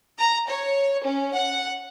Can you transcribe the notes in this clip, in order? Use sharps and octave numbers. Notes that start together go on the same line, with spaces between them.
A#5
C#5
C#4
F#5